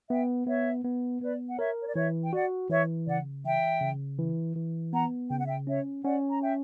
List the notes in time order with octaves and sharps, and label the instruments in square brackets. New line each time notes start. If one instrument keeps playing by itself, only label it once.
[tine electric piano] B3 [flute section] E5 G5
[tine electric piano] B3 [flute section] C#5 E5
[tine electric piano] B3
[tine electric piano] B3 [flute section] B4 D5
[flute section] F#5
[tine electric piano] A#4 [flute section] C#5 E5
[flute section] C#5
D5
[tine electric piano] E3 [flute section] C#5 E5
[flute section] G5
[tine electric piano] F#4 [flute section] D5 F#5
[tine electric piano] E3 [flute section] C#5 E5
[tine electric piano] C#3 [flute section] D5 F#5
[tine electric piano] E3 [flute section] E5 G5
[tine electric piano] C#3
E3
E3
[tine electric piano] B3 [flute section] F#5 A#5
[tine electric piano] C#3 [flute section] G5
[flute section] F#5
E5 G5
[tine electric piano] C#4 [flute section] C#5 E5
[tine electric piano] C#4 [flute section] D5 F#5
[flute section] A#5
E5 G5